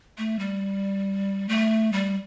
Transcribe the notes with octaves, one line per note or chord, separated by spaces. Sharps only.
A3
G3
A3
G3